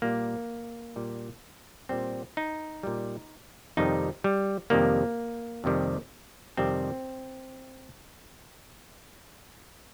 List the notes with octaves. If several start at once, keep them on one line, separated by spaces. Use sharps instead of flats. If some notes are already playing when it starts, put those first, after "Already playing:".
A#2 G3 A#3
A#2 G3
A#2 G3 C4
D#4
A#2 G3
F2 C3 D#3 G3 D#4
G3
F2 C3 D#3 G3 A#3
F2 C3 D#3 G3
F2 C3 D#3 G3 C4